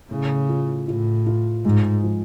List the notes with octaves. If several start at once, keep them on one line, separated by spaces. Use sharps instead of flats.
A2 C#3
F4
A2 F4
F4
G#2 G#3
F3